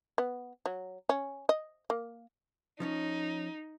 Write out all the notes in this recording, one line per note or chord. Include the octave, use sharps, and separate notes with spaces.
B3
F#3
C#4
D#5
A#3
F3 C#4 D#4 C#5